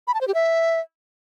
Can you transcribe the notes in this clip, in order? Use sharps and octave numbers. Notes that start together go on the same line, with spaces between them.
B5
A5
C5
G4
E5